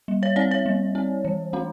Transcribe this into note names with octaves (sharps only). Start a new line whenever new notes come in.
G3
C#5
C4 D5
C#5
G3
C4
E3
A3 D4